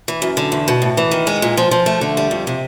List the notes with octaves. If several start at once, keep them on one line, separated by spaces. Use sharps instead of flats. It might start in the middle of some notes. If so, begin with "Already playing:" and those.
E3
F#2
D3
E2
B2
A2
E3
D#3
G#3
A#2
F3
F3
A3
D3
G3
F2
C3